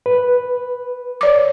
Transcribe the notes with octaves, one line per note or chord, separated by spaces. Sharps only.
B4
C#5 D5 D6